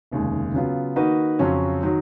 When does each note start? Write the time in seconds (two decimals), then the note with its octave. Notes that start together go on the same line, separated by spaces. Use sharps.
0.12 F1 D#2 C#3 G#3
0.54 C#3 F#3 B3 F4
0.96 D#3 A#3 D#4 F#4 B4
1.39 F2 C#3 F#3 C#4
1.83 D#3 F#3